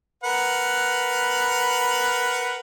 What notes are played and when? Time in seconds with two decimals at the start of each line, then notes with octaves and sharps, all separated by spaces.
0.24 A#4 B4 F#5